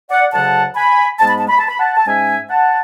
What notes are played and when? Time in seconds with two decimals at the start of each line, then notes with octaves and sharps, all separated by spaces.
0.11 D5 F#5
0.33 D2 C#3 F#3 F#5 A5
0.76 G#5 B5
1.19 G#2 G#3 B3 A5
1.29 B5
1.39 A5
1.49 B5
1.59 A5
1.69 B5
1.79 F#5 A5
1.97 A5
2.07 G#2 G#3 C#4 E5 G#5
2.49 F#5 A5